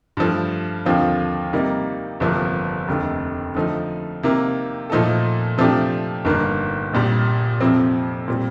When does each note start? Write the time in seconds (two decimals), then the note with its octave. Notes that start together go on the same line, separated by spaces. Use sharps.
0.17 G2 F3 A3
0.85 D#2 D3 F3 C4 F4
1.53 C3 D#3 G3 A#3 D#4
2.20 G1 F2 C3 F3 A#3
2.88 F1 D#2 D3 A3
3.55 D3 F3 A3 D#4
4.23 C3 D#3 A#3
4.90 A#2 F3 A3 D#4 A4
5.58 C3 F3 A3 D4 G4
6.25 G1 G2 D#3 A#3
6.93 A#1 A#2 G3
7.60 F2 C3 F3 C4
8.28 A#2 G3 C4